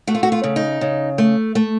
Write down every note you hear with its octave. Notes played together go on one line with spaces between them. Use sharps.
A3 F#4
F4
F#4
F4
C#3
D#4
C#3
A3
A3